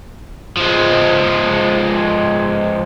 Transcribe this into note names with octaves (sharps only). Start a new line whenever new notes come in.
F3 G#3